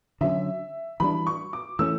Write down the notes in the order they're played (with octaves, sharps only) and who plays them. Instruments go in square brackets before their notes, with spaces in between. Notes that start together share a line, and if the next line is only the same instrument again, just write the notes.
[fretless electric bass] D3 F#3 C#4 [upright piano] E5
[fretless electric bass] E3 G3 D4 [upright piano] B5
[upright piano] C#6
D6
[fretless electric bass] E3 A3 C#4 [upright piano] E6